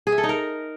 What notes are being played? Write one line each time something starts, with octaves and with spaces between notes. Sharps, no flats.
G#4
E5
A4
D#4
A#4